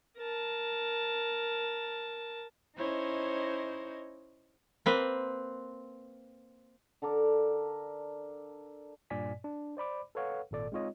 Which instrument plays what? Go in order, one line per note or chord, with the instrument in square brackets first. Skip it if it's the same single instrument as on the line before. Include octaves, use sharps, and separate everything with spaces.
[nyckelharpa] A#4 A5
[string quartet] C#4 D#4 E4 C5 C#5 D#5
[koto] A#3 C4 B4
[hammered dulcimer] D3 A4 A#4 D6
[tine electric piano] G2 A#2 D5 G#5 B6
D4
C5 D5 B5 D6
A4 B4 C#5 F5 F#5
G#1 A#2 A4 D5
G#3 C4 D#4 F4 C#5 D#5